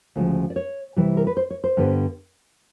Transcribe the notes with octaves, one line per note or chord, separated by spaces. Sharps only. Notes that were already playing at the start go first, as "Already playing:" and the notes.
D2 C#3 F3 G#3
D5
C#5
C3 E3 G3
A#4
B4
C5
C#5
C5
G2 D3 G3 B3